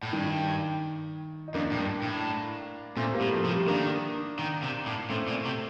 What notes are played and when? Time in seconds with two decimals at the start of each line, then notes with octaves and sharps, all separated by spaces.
0.03 A2
0.12 G2 D#3
1.48 D#4
1.54 F2 A#3 D4
1.71 A2
1.78 G2
2.02 A2
2.96 A#2 A3 C4
3.14 G3 A#3
3.21 A2
3.32 F3 A3
3.44 C3
3.50 G3 A#3
3.68 D#3 A#3 D4
4.39 D#3
4.62 C3
4.86 A2
5.09 A2 A3 C4
5.28 A#2
5.45 C3